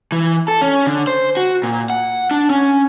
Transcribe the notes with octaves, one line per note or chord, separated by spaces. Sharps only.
E3
A4
C#4
D3
C5
F#4
A#2
F#5
D4
C#4